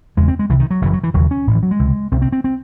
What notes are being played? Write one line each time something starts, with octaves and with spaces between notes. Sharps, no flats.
F#1 E2 C#3 G#3
C4
G#3
C2 C3 E3
D#3
F#3
F#1 F#2 C#3 E3
F#3
E3
E1 D#2 C#3 F#3
C#4
A1 A2
E3
F#3
G#3
C#2 C3
C2 C3 C4
C4
C4
C4